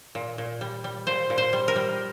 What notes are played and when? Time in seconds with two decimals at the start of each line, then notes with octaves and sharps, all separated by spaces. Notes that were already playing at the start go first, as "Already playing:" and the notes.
0.15 A#2
0.38 A#2
0.61 G3
0.84 G3
1.07 A#2 C5
1.30 A#2
1.38 C5
1.53 G3
1.68 A#4
1.76 G3